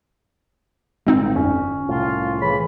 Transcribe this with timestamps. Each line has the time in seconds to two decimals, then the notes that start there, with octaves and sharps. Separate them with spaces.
1.07 A1 D2 G2 G#3 C4 D#4
1.36 G1 F2 C#4
1.89 C2 A2 F4
2.40 C#3 E3 B5